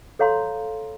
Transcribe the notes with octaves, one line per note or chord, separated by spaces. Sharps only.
A4 C#5 F5 A#5 C6